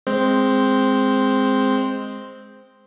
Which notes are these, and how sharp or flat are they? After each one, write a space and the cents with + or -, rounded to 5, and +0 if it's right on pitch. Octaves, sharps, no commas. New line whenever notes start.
G#3 +0 C4 +0 C5 +0